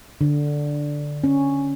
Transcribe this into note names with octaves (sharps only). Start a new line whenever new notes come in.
D3
C#4